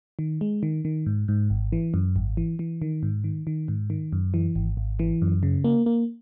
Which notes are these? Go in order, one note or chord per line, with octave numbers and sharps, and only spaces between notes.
D#3
G#3
D#3
D#3
G#2
G#2
G#1
E3
F#2
G#1
E3
E3
D#3
G#2
D#3
D#3
G#2
D#3
F#2
E3
G#1
G#1
E3
F#2
C#3
A#3
A#3